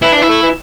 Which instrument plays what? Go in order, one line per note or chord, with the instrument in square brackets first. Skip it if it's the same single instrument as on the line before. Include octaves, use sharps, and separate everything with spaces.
[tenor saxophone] E3 [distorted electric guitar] E4
[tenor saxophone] E3 [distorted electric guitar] D4
[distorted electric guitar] E4
[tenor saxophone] A3
E3